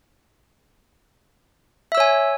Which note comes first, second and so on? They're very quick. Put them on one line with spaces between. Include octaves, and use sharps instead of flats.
E5 E6 C#5 G#5